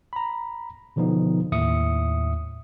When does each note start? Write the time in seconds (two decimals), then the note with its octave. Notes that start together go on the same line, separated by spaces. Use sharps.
0.13 A#5 B5
0.96 B2 D3 F3 B3 D#4
1.52 D#2 A2 E5 D#6 C#7